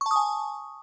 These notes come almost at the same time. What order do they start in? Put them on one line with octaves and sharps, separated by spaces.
C#6 A5 D#6 G#5